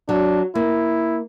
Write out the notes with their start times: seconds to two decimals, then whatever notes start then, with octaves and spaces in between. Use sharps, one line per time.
0.08 F#3 D4
0.55 A#3 E4